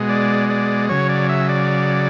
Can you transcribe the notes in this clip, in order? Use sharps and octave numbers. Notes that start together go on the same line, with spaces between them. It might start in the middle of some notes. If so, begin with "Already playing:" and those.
Already playing: B2 G#3
D5
D5
C#3 F#3 C#5
D5
E5
D5